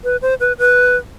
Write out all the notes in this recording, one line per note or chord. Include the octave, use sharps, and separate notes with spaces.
B4
C5
B4
B4